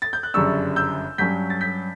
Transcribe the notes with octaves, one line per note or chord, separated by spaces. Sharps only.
A6
G6
F#6
G1 F#2 C#3 G3 D4 C#6 E6
E6 G6
G2 F#3 C#4 G6 B6
A6
G6 B6